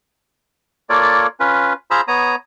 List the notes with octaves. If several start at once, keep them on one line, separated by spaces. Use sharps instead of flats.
A#3 F4 A4 C#5 D5
C#4 F4 B4
F4 G#4 C5 A#5 B5 E6
B3 C#5 A#5 D#6